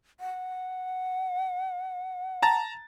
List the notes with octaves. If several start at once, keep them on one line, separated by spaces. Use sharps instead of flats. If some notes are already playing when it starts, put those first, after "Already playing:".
F#5
A5 A#5 A6